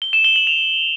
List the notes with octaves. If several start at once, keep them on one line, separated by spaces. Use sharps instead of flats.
G7
E7
G7
F#7
F7